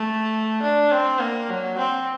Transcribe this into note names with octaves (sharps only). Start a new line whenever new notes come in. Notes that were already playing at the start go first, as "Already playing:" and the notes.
Already playing: A3
D4
C4
A#3
F#3
C4